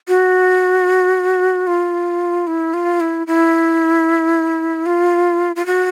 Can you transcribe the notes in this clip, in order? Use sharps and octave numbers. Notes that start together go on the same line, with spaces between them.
F#4
F4
E4
F4
E4
E4
F4
F4
F#4